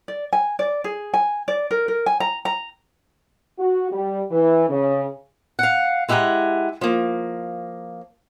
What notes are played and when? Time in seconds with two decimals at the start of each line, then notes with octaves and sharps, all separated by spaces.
0.08 D5
0.33 G#5
0.59 D5
0.84 G#4
1.14 G#5
1.48 D5
1.71 A#4
1.88 A#4
2.06 G#5
2.20 A#5
2.45 A#5
3.59 F#4
3.92 G3
4.31 E3
4.69 C#3
5.59 F5 F#5
6.09 G#3 E4 G4 F#5 G#5 A#5
6.81 F3 A#3